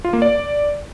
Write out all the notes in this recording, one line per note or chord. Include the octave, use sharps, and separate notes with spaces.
F4
A#3
D5